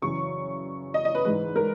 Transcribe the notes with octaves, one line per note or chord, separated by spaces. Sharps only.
F#2 C#3 E3 C#6
D#5
D#5
B4
G#2 E3 B4
A#4